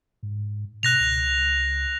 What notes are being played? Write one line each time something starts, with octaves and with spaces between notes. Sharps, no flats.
G#2
B2 F#6 A#6 F7
C#2